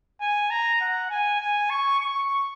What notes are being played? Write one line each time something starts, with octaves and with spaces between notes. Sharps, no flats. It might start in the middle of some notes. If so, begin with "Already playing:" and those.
G#5
A#5
F#5
G#5
G#5
C#6
C#6